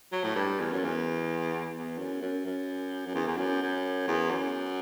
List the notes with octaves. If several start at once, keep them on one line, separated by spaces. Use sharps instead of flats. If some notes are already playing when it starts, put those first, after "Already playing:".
F#3
A2
G2
E2
F#2
E2
E2
F#2
F#2
F#2
F#2
E2
E2
F#2
F#2
E2
F#2